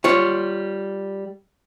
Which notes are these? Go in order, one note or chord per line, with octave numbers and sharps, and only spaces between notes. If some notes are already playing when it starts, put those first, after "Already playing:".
G3 F4 C#5